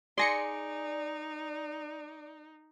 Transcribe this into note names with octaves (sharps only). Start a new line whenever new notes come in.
D#4 G#4 D5 G#5 C6 A#6 C#7